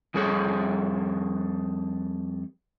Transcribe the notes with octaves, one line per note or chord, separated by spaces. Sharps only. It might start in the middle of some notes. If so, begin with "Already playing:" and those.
F2 G3 G#4 A4 C#5